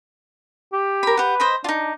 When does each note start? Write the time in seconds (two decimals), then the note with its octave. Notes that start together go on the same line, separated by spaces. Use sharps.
0.73 G4
1.03 A#4 B5
1.17 G4 B4 F#5
1.40 C5 D#5 B5
1.64 D4 D#4 F4